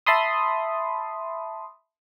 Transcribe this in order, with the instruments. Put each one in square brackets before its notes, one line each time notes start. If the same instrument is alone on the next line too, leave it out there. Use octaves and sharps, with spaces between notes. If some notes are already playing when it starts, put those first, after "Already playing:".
[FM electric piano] E5 A5 B5 C6 D#6